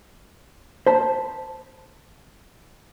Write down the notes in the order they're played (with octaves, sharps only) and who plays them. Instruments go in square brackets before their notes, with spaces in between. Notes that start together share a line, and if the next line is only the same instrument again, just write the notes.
[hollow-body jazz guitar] C5 A5 B5